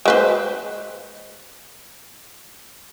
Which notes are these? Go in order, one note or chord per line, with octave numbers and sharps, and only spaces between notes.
G#3 B4 C5